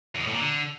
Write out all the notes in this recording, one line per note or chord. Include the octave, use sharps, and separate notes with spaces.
E2
B2
A2
A#2
D3